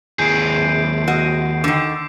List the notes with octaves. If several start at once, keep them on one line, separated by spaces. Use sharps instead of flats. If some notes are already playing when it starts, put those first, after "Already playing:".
D#2 G#4 G6 C7 D7
F#4 D#5
D3 D#3 D6